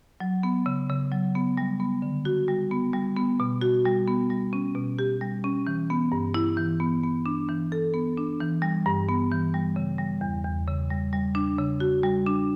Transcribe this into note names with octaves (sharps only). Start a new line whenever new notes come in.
F#3
B3
C#3
C#3
F#3
B3
G3
B3
D3
F#4
G3
B3
G3
B3
B2
F#4
G3
B3
G3
C#4
B2
G4
G3
C#4
E3
B3
G2
E4
E3
B3
B3
D4
E3
A4
B3
D4
E3
G3
G2
B3
E3
G3
C#3
G3
E2
E2
C#3
G3
G3
D4
C#3
F#4
G3
D4